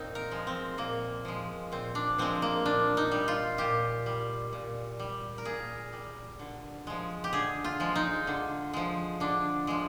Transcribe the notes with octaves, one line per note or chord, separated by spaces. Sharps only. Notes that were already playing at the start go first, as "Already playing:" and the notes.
Already playing: A#2 A#3 C4 D#4
A#4
F3 G#3
C4
A#2 A#3
F3 G#3
A#2 C4
D4
F3 G#3 C4
A#3
A#2 D4
D#4
G3
F4
A#2 G4
G3
A#2
G3
A#4
A#2 G#4
G3
D3
F3 G#3
G4
D3 G#4
F4
F3 G#3
D#4
D3
F3 G#3
D3 D4
F3 G#3